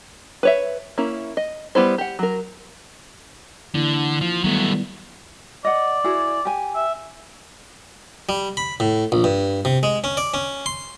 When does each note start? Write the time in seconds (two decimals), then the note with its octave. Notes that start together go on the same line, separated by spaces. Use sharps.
0.43 B4 C#5 E5
0.98 A#3 C#4 E4
1.37 D#5
1.75 G3 B3 E4 C5
1.98 G4 F#5
2.19 F#3 A#4
3.75 D3 E3 A#3 E4
4.21 F3
4.44 D#3 F#3 G3 A3 B3
5.65 D5 D#5 F#5
6.04 E4 F#4 G#4
6.45 G4 G#5
6.75 E5
8.29 G3
8.57 B5
8.80 A2
9.12 A#1
9.24 G2
9.65 C3
9.83 G#3
10.04 C#4
10.17 D5
10.34 C#4
10.66 C6